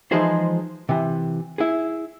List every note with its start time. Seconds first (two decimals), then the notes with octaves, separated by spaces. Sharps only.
0.12 E3 F3 G#3 D#4 G#4 C5
0.89 C3 E3
1.58 E4 G#4